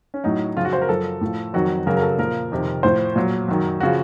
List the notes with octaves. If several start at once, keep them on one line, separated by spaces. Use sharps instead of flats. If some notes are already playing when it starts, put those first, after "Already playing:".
C#4
A2 F#3 D#4
F#2 C#3 F3 F4
F#4
C5
A#4
F#2 F3 A4
A2 F3
F2 D#3 F#3 F#4
F#2 C#3 F#3 A#4
A#4
A4
A#2 F3 A#4
F2 C3 D#3
A2 F3 C5
A#2 F#3
F#2 D#3 F#3
C#3 F3 F#4